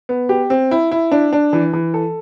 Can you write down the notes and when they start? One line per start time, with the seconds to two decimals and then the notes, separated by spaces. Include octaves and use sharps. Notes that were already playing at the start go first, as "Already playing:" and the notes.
0.09 B3
0.29 G4
0.50 C4
0.71 E4
0.92 E4
1.12 D4
1.33 D4
1.53 E3
1.73 E3
1.94 A4